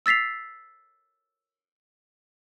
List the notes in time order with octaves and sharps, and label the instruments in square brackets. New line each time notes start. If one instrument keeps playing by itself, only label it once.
[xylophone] E6 A6 B6 C7 F7